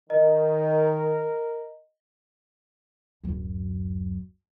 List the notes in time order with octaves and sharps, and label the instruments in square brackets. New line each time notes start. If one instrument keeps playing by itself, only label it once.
[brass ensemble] D#3 [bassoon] A#4 [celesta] D#5
[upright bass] D1 F#2